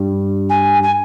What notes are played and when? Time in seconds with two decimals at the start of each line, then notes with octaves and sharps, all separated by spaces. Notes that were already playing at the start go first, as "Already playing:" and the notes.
Already playing: G2 G3
0.50 G#5
0.83 G#5